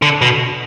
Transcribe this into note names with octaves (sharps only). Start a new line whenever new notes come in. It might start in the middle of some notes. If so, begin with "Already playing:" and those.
D3
B2